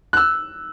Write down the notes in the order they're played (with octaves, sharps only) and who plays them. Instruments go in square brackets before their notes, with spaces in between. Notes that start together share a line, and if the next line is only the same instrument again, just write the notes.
[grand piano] F#6
E6